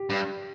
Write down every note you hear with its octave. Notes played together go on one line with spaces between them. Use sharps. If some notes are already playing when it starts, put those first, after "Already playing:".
Already playing: G4
G2